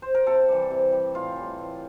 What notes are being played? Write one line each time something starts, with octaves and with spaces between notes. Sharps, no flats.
C5
A#4
C3 A4
E3 G3
C3
G3
A2 F4
E3 G3
A2